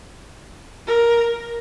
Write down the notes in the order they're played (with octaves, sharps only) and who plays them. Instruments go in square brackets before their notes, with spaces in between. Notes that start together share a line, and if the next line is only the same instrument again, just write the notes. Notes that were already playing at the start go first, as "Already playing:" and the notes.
[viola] A#4